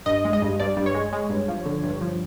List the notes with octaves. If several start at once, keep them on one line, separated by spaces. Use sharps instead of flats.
G2 D#5
G#3
D#5
G2
G2 D5
G2
C#5
G#3
G#3
G2
F3
D3
G2
F3